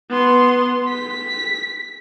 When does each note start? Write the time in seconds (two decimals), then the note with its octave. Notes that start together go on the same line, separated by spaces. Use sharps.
0.10 B3 C6
0.88 B6